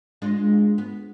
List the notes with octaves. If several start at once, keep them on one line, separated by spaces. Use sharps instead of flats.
G#3 D4 F4
B3